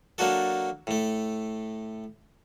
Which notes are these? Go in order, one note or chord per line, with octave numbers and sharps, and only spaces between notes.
F#3 A#3 D4 F#4 A4
A2 A3